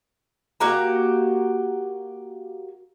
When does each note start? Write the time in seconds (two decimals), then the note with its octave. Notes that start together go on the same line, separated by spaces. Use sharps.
0.60 A#3 F#4 G4 A#5